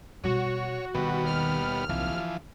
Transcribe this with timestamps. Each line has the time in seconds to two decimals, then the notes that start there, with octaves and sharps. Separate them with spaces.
0.24 B2 G3 F#4 C#5
0.95 B2 D#3 G3 B3
1.23 D#2 F6
1.89 C2 E3 F3
2.07 D3